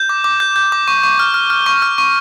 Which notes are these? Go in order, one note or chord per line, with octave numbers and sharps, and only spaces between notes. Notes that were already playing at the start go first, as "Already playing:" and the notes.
Already playing: G6
D6
D6
G6
G6
D6
C#6
C#6
F6
F6
F6
C#6
F6
C#6